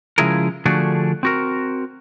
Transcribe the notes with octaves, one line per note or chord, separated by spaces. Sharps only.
C#3 F3 G#3 E4 G#4 A#4
D3 F3 A3 D4 F#4 G#4
C4 F#4 A#4